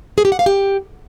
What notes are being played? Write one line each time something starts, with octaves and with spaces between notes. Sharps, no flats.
G#4
G4
F#5
F5
G4